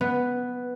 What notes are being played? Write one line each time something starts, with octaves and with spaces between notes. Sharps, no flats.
B3